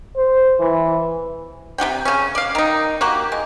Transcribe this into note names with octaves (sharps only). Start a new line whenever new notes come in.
C5
E3
C3 F#4 F#5 G5
C#3 C#4
D5 F5
D#3 D#4
A#3 F#4 G4
G#3